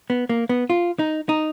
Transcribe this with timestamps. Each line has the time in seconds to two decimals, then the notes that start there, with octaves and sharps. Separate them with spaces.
0.10 B3
0.29 A#3
0.49 B3
0.70 F4
0.99 D#4
1.29 D#4